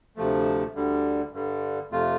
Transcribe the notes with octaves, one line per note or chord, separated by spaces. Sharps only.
D2 C3 F3 A3
D2 D3 G3
G2 D3 G3
F2 C3 A3 F4